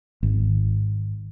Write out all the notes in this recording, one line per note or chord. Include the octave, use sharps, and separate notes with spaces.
G#1